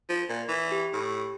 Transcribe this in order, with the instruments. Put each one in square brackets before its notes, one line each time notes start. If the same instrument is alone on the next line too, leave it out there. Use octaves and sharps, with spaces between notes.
[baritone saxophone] F3
A#2
E3
[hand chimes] G4
[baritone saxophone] A2